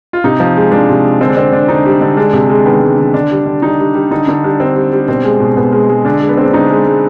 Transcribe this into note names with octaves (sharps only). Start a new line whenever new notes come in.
F4
C3 D#4
F3
G#3
F3 D4
C3
G#3
D3 C4
D4
D3 C4
D3 D4
D3 D#4
G3
D3
G#3 D4
C3
G#3
D#3 B3
G#3
D#3
D3 D4
G3
D3
G3 D#4
G3
G3
D3 D#4
D3 D#4
G3 D4
D3 C4
G3
G3
B2 C4
G#3
B2
B2 B3
G#3
G#3
D3 D4
G#3
B3
G#3 C4
D4
D3 D#4
G#3
G#3